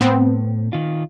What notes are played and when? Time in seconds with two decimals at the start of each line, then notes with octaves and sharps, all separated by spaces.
0.01 A2 B3 C4
0.73 D#3 F4